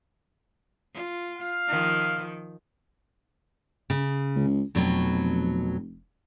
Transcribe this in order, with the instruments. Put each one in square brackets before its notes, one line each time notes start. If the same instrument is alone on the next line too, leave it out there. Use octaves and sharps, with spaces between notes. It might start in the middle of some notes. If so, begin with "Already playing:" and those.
[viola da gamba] F4
[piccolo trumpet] F5
[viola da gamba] D#3 F3
[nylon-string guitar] C#3
[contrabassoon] C#2
[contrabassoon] F1 [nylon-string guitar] F2 B2 F#3